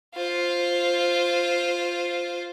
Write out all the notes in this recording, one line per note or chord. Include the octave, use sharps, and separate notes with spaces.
F4 C5